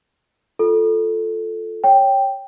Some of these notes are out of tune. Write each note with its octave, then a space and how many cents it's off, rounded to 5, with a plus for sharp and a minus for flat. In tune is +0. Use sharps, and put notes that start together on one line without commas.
F4 +5 A4 +0
C#5 +0 G5 +0